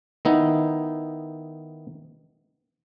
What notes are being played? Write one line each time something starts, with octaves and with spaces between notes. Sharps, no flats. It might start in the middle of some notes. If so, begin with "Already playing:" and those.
D#3 B3 D#4 E4